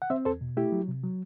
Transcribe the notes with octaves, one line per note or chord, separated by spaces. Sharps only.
F#5
C4 C5 E5
E2 A4 C5
B2
A3 E4 G4
F#3
C3
F#3